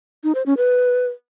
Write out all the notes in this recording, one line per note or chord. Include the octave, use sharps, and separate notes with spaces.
D#4
C5
C#4
B4